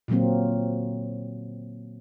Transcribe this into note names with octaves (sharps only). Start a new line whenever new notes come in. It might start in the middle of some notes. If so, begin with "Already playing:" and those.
A#2 D3 F#3 A#3 C4